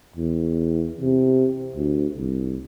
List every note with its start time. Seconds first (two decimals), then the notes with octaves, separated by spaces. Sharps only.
0.16 E2
1.01 C3
1.76 D2
2.17 C2